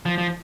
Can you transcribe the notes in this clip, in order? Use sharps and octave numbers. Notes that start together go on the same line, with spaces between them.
F3
F3